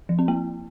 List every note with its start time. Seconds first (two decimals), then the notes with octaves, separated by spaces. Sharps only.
0.09 F3
0.19 C4
0.28 A#3